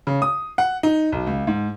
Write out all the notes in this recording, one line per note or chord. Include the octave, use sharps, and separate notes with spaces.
C#3
D#6
F#5
D#4
B1
C#2
G#2